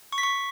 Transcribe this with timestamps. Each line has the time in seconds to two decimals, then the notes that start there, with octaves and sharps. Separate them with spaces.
0.13 C#6
0.18 B6
0.23 C#6